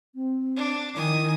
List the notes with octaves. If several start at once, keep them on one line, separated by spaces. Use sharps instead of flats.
C4
D4
D#3 E4 G#5 D#6